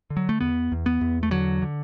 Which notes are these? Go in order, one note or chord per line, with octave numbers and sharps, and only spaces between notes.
D3
F#3
A3
E2 B3
E2
B3
E2
A3
D3 F#3
D3